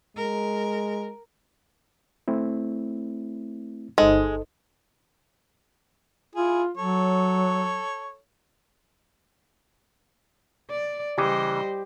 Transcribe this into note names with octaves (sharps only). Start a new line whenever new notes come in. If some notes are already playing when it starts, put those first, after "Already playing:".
G#3 A#4
A3 C4 E4
G1 G#3 D#4 A4 C5 D#5
E4 F4 G#4
F#3 A4 C#5
D5
C#3 E3 G3 G4 C5 D#5